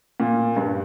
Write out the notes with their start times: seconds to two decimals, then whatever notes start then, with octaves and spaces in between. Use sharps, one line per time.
0.20 A#2
0.56 G2